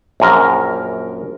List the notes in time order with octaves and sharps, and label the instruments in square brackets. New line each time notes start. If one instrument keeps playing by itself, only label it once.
[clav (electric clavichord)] A#1 F#2 A#4